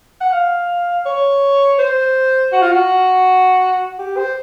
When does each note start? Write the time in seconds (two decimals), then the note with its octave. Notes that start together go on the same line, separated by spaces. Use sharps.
0.21 F#5
0.33 F5
1.06 C#5
1.79 C5
2.53 F#4
2.62 F4
2.72 F#4
3.99 G4
4.17 C5